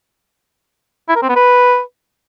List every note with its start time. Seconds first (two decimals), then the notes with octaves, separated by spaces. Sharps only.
1.09 E4
1.16 A#4
1.22 C4
1.29 B3
1.36 B4